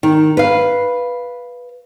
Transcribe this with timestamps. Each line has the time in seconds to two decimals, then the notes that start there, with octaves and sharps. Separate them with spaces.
0.03 D#3
0.37 B4 F5